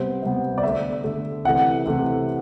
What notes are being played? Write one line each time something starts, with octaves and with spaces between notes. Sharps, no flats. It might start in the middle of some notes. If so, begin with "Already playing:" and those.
Already playing: C3 G3 B3 C5
C3 G3 B3
D5
D3 A3 E5
D3 A3
C3 E3 A3 F#5
C3 E3 A3